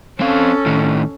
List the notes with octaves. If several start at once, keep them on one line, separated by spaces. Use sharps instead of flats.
C4 C#4 A4 F5
A2 D#3